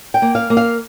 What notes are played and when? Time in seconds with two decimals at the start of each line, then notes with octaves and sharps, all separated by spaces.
0.14 G5
0.22 A#3
0.35 F5
0.50 A#3
0.57 F5